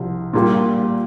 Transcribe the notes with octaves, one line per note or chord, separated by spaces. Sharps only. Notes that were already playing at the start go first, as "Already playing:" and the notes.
Already playing: C2 C3 F3
A#2 G3 A#3 F4